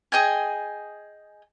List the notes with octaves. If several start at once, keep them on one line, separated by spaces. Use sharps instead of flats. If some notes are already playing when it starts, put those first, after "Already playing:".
G#4 D#5 G5 G#5